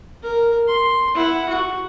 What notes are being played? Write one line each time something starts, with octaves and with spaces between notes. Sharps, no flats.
A#4
C6
E4 F#5
F#4